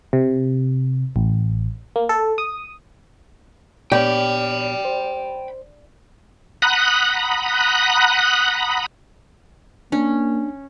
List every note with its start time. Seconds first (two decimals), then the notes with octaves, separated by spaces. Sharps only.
0.13 C3
1.16 A1
1.96 A#3
2.09 A4
2.38 D#6
3.92 A#2 B3 G4 C#5 D5 G5 B5
4.85 C5
6.62 F#5 A#5 B5 D#6 F#6
9.92 A#3 C#4 D4